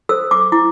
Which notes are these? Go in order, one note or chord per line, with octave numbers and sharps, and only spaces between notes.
A4 C5 E6
D6
E4 D6